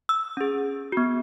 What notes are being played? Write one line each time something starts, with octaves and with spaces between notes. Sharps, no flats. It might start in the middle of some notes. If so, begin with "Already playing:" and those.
E6
C#4 G#4
B3 F#4